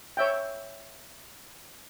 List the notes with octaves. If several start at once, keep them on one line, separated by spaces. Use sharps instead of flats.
C#5 E5 G5